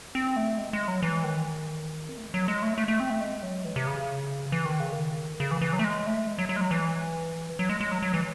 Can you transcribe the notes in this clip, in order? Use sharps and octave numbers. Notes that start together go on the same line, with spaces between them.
C4
A3
G#3
G#3
F#3
E3
D#3
C4
A3
G#3
F#3
G#3
A3
A3
A3
C4
A3
G#3
F#3
E3
C3
C#3
E3
D#3
C#3
D#3
C#3
E3
E3
F#3
A3
G#3
A3
G#3
F#3
F#3
G#3
F#3
E3
F#3
G#3
G#3
F#3
F#3
E3